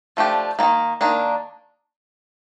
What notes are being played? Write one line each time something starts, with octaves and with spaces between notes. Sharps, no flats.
F3 A3 D4 G4
D#3 G3 A#3
D#3 A#3 D4